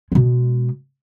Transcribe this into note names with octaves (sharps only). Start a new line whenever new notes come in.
B2 G#3